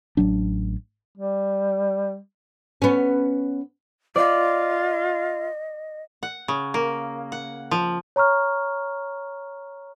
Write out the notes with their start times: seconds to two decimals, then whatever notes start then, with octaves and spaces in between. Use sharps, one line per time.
0.17 A1 F#3 D4
1.18 G3
2.82 B3 C#4
4.16 F4 D5 D#5
6.23 F#5
6.48 C#3
6.74 A#3
7.32 F#5
7.71 F3
8.16 C#5 A#5 C#6 F6